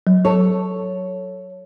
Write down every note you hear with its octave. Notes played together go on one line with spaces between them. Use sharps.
F#3
A4 C#5